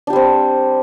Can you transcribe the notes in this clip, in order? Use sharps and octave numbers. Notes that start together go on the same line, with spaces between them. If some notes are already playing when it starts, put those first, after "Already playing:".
G3 C4 D4 G4